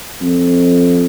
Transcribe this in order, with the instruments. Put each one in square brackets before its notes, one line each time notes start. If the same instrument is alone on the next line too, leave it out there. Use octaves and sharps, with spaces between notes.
[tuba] F2